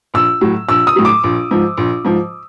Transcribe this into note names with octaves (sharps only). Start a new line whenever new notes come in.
A#1 E6
A2 F#3
A#1 E6
D#6
A2 F#3
D6
A#1
G#2 F3
A#1
G#2 F3